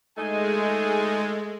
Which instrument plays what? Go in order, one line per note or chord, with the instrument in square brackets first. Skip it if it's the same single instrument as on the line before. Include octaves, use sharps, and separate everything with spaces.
[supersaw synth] G#3 [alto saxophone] A3 [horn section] D#4 G#5